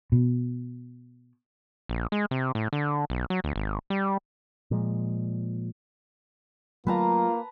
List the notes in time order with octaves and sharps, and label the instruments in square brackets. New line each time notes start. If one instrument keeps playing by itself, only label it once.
[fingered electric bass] B2
[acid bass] A#1
G#3
C3
A2
D3
B1
F#3
D2
G#1
G3
[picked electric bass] A#2 F3 G#3
[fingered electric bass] F#3 A3 [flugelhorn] A#3 [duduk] F4 [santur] B4 A5 A#5